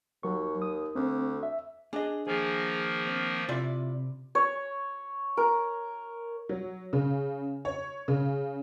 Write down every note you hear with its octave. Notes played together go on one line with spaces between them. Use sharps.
D#2 F#3 C#6
D#6
D2 C4
E5
D4 G#4 D#5
D#3 F3 A#3 G#4
C4
C3 E4 F4 D5
C#5
A#4
F#3
C#3
C#5
C#3